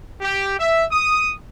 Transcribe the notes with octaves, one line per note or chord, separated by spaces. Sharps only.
G4
E5
D#6